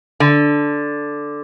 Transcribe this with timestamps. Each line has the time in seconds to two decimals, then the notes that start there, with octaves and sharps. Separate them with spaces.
0.20 D3